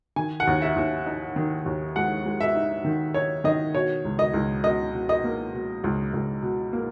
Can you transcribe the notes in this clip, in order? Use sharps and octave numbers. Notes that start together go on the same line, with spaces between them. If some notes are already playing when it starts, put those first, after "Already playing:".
D#3 G#5
F#5
D#2
E5
D#2
D#4
D#3
D#2
G#3 F#5
G#3
E5
D#4
D#3
D#4 C#5
D#3 D#5
B2 C#5
C#2
D#5
C#2
B2 D#5
B2
D#5
A#3
B2
C#2
C#2
B2
A#3